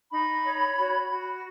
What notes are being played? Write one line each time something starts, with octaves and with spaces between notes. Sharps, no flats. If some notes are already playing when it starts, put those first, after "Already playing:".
D#4 B5
C#5
F#4
F#4